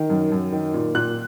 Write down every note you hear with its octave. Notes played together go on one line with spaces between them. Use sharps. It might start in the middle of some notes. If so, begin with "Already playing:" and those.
Already playing: D#3
F#2
F#2
D#3
A#2
A#2 F#6